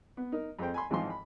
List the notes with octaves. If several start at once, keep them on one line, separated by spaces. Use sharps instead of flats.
B3
D#4 A#4
F2 G#4 A4 C5 G5
G#5 B5 C6
G#1 G#2 E3 F3 F4 C6
B5